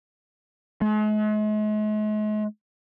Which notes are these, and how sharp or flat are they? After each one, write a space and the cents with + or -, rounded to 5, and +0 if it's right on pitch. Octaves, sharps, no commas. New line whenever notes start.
G#3 +45